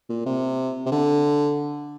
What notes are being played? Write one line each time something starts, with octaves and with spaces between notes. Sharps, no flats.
A#2
C3
C3
D3